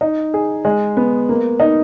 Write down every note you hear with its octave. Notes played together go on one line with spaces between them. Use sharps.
D#4
G#4
G#3
B3
A#3
D#4